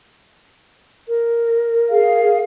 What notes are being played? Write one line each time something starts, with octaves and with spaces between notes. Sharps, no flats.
A#4
G#4 F5